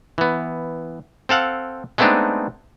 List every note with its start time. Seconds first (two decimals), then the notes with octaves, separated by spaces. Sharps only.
0.18 E3 B3
1.29 C4 A4 F5 F#5
1.98 G#3 A3 B3 C4 D4 D#4